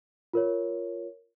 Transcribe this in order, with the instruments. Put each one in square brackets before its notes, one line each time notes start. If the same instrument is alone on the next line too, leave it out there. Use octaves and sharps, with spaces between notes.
[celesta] F4 A#4 C#5